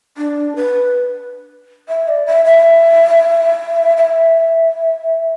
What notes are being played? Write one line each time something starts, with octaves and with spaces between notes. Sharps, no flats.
D4
B4
E5
D5
E5
E5
E5